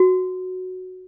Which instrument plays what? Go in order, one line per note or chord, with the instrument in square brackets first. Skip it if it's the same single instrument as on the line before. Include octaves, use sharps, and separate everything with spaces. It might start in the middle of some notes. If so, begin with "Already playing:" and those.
Already playing: [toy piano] F#4